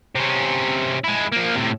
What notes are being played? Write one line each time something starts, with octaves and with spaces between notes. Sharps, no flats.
C3 C#4
G#3 E4
F3 A#3
A2 C3